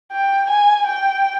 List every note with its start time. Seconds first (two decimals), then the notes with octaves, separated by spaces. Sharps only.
0.12 G5
0.49 G#5
0.86 G5